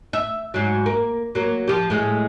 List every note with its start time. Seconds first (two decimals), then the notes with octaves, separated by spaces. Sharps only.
0.13 E5
0.54 G#2 F#3
0.86 A#3
1.35 F#3 A#3
1.68 F3 G4
1.90 A2 G#3